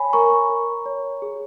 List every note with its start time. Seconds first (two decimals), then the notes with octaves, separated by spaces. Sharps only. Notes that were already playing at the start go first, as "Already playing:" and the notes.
Already playing: C#5 G#5 B5
0.13 A#4 A#5 C#6
0.49 A#4
0.86 C#5
1.22 G#4